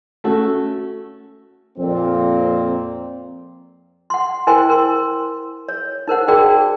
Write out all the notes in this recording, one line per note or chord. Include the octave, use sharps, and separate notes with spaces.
A3 C#4 F#4 A4
F2 A#2 C4
F#5 C6
E4 A#4 C5 G5 G#5 C6
A#4 C6
C#5
D#4 A#4 C5 F#5
D#4 F#4 G#4 A#4 D5 G5